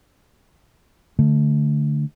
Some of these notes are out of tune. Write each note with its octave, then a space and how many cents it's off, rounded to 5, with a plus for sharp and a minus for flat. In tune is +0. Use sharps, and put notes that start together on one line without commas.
D3 +0 A3 +0